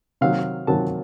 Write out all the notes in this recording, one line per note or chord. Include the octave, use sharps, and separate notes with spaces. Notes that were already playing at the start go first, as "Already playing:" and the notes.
C3 D#3 F#3 A#3 F5
C3 D#3 F#3 A#3 A5